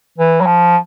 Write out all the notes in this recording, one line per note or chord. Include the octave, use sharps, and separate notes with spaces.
E3
F#3
F3